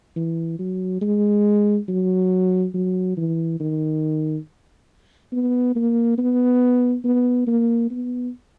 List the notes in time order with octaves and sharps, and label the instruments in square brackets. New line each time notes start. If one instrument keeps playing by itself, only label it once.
[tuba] E3
F#3
G#3
F#3
F#3
E3
D#3
B3
A#3
B3
B3
A#3
B3